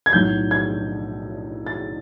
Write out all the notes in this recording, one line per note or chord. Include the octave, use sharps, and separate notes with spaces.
G#6
B1 A2 F#3 G6
G#6
A6